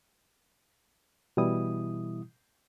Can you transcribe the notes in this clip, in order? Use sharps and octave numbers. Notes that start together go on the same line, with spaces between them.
B2 E3 G3 E4 D#6